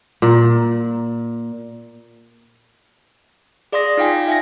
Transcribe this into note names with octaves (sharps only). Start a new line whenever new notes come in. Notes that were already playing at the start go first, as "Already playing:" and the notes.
A#2
G#4 D5 F5 C6 D#6 A#6
D#4 F4 F5 G5 G#5
E5 G5 G#5 A#6